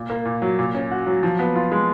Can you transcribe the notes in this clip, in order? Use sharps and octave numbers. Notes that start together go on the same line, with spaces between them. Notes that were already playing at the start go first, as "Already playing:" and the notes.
Already playing: A#2
A#3
A#2
F#3
A#2
C#4
F#4
F#3
F3
B3
F4
G#3